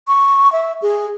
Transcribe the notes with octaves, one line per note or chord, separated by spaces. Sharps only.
C#6
E5
G#4